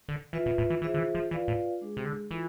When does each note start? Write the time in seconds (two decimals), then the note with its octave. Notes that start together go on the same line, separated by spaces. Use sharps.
0.08 D3
0.33 E3 F4 B4 E5
0.46 B2
0.58 A2
0.70 E3
0.82 E3 F4 G#4 C5 E5
0.94 D3
0.98 E3
1.15 F3
1.31 E3 F4 B4 D5 F5
1.48 A2
1.81 G#3 D4 G#4
1.97 C3
2.05 D3
2.30 E3 F4 A4